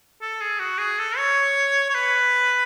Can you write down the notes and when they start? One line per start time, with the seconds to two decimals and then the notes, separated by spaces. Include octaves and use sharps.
0.21 A4
0.41 G#4
0.60 F#4
0.78 G#4
0.99 A4
1.17 C#5
1.90 C#5
1.94 B4